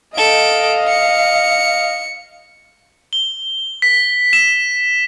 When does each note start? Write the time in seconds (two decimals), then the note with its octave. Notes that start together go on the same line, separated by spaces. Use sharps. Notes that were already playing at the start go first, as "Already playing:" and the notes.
0.17 A4 D#5 F5 D7
0.88 C#7
3.13 G7
3.82 B6
4.33 E7